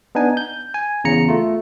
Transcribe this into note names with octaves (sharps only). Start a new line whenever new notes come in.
B3 D4 D#4 G#5
G6
G#5
E2 C#3 A#5 C#7
A3 F4